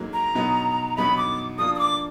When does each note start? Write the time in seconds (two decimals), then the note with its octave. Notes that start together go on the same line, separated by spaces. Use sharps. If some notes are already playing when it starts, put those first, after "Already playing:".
Already playing: G#2 F#3 A#3
0.13 A#5
0.35 B2 F#3 B3 D#4
0.97 B2 F#3 B3 D#4 B5
1.17 D6
1.58 F3 A#3 D4 F4 D#6
1.75 D#6
1.79 D6